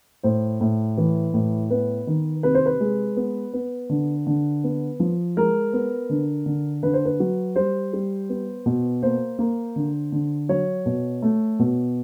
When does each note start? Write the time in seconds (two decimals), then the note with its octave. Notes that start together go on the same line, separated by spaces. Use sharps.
0.23 A2 C5
0.61 A2
0.97 E3
1.34 A2
1.70 B3 B4
2.07 D#3
2.43 C3 B4
2.55 C5
2.66 B4
2.80 G#3
3.17 B3
3.54 B3
3.90 D3
4.27 D3
4.64 B3
5.00 F3
5.37 G#3 A#4
5.73 B3
6.10 D3
6.46 D3
6.83 D3 B4
6.93 C5
7.05 B4
7.20 F#3
7.56 G3 C5
7.93 G3
8.29 B3
8.66 B2
9.03 A#3 C5
9.39 A#3
9.76 D3
10.12 D3
10.49 F#3 C#5
10.86 B2
11.22 A3
11.59 B2